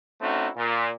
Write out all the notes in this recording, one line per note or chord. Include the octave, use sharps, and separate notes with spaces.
A3 C4 C#4 D#4 E4 F#4
A#2